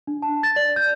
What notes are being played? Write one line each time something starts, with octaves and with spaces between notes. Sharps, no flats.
D4
A5
A6
D5
G6